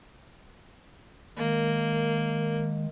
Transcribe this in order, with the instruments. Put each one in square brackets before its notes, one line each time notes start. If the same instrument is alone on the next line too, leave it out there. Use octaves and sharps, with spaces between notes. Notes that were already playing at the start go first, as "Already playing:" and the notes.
[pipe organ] D#3 G#3 [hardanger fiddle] A#3